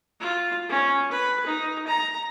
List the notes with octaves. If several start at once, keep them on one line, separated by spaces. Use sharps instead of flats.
F4
C#4
B4
D#4
A#5